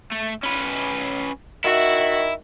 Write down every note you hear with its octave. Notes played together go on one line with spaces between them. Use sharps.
A3
C#4 B4
D#3 E4 F#4 E5